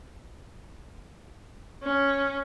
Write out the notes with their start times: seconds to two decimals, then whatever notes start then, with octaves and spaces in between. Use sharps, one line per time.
1.83 C#4